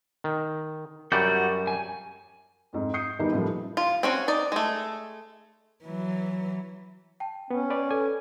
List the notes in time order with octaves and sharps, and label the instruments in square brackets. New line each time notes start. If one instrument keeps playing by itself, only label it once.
[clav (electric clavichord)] D#3
[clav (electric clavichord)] F#2 G3 D5 [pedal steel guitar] F#4 G6
[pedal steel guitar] G#5
[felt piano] F2 G#2
D#6 G6 C7 C#7
E2 D#3 G3 D#4 E4
A2 C#3 F3 G3 A3 A#3
[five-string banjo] F4
C4 C#4 F#4
D#4 D5
G#3 A3
[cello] E3 F#3
[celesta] G5 A5
[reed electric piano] B3 [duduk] C#4
[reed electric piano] B4 D5
[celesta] A4 [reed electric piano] G#5